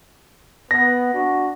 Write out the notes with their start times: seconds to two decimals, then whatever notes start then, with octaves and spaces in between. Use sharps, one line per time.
0.71 B3 A#6
1.13 D4 F#4